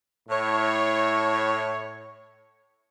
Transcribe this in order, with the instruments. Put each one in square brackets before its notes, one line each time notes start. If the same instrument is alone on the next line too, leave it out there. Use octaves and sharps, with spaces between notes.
[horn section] A2 C#5